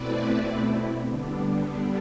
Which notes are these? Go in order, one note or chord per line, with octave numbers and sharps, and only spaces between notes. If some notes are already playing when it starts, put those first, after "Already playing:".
Already playing: B2 A3 C4 E4 B4 D5
D3 G3 B3 D4